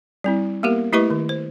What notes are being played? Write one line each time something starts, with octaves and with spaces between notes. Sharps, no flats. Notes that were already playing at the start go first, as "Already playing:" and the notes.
G3 C4 E4
A#3 B3 G4 A#4
A3 E4 G4 B4 D#5 C#6
D#3
C5